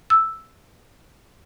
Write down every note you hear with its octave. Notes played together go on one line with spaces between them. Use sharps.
E6